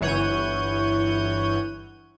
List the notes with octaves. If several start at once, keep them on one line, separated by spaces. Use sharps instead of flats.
G1 E3 C#5 F#5 G6 D#7